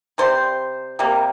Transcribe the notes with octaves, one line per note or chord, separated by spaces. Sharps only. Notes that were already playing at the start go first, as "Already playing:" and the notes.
C3 G3 C5
C3 G3 A#3